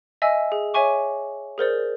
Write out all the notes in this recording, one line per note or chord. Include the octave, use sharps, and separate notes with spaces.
D#5 E5 G#5 E6
G#4
C#5 E5 G#5 C#6 D6
G#4 A#4 C5 D5